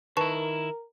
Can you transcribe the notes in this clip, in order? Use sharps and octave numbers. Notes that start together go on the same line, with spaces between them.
D#3 E4 A#4 B4 A5 C#6